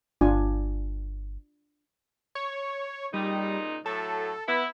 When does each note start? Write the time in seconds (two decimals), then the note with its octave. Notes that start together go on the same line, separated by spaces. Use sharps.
0.21 G1 D4 F4 G#5
2.35 C#5
3.14 A#2 C#3 G3 D#4
3.86 A2 F#3 A4
4.48 B3 E4